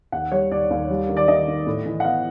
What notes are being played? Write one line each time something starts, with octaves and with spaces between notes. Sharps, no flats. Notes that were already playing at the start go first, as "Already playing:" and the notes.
D#2 F#5
G3 C#5
D#2 D5
D#2
G3
D#3
D5
D#3 D#5
D#3
A2
E3
F#5
B3 F5